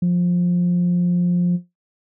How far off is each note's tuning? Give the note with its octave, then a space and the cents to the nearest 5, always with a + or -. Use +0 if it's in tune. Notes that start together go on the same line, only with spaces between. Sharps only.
F3 +15